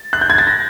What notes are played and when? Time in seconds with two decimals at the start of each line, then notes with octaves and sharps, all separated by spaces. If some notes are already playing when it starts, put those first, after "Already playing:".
Already playing: A6
0.13 F#6
0.21 G6
0.30 G#6
0.38 A6
0.47 A#6